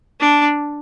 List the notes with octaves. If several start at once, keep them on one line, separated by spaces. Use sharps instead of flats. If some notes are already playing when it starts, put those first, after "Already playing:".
D4